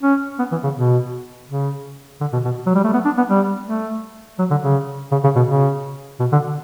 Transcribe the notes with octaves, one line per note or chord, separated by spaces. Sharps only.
C#4
B3
E3
C#3
B2
C#3
D3
B2
B2
F#3
G3
A3
B3
D4
B3
G3
A3
F#3
D3
C#3
C#3
C#3
B2
C#3
B2
D3